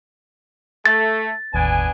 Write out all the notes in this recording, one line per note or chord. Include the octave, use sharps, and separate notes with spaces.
A3 A6
G1 D#2 A2 B3 D4 G#5